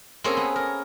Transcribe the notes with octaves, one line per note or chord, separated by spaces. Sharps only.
A#3 C4 C#4 G#4 A4
B3
A#4